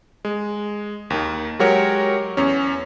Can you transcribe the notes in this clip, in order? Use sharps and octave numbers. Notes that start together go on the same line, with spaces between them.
G#3
D#2 D#3
F#3 G#3 F#4 G4 A#4 C#5
E2 C#4